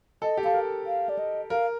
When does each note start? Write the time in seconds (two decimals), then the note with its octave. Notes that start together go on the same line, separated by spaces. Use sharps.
0.22 A4 D#5
0.37 G4
0.44 A4 F5
0.54 A#4
0.87 F5
1.09 D5
1.19 D#5
1.50 A#4 F5